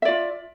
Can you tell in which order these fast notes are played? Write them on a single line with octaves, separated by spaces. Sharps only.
E5 D5 F4